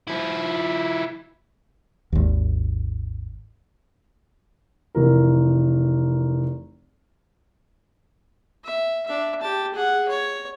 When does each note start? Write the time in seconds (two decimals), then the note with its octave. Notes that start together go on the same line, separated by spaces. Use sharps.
0.07 F3 E4
2.12 G#1 D#2
4.95 F1 E3 A#4
8.65 E5
9.06 D4 E5
9.42 G4 A5
9.74 G#4 F#5
10.09 C#5